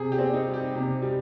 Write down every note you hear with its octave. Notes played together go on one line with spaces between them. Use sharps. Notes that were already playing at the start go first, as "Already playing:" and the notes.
Already playing: C3 G#4
G4
C4
D#4
G3
G4
C3
G3